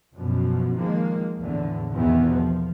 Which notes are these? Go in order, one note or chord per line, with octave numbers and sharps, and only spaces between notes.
F#2 B2 F3
D#3 F3 G#3 A#3
E2 A2 D3
B1 E2 C3 D#3 E3 B3
F3